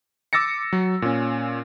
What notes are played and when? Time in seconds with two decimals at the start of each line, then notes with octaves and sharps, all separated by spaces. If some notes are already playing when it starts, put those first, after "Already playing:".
0.33 D6 E6 A6 A#6 C#7
0.73 F#3
1.02 A#2 C#4